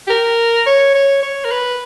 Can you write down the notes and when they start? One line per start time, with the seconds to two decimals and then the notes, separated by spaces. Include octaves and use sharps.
0.07 G4
0.10 A#4
0.66 C#5
0.95 C#5
1.23 C#5
1.45 A#4
1.52 B4